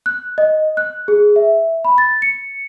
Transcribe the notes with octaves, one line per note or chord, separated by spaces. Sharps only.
F#6
D#5
F#6
G#4
E5
B5
A6
C#7